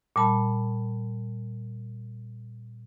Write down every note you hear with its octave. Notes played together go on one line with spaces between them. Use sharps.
A#2 G3 A5 B5